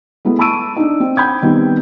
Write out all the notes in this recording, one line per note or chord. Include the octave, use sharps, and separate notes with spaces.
G#3 A3 B3 E4
A5 B5 C#6 E6 D7 D#7
D4 D#4
C4
F#5 G5 B5 G6 G#6
D#3 G3 B3 C4